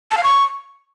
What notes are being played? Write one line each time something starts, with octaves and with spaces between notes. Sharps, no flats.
A5
F5
C#6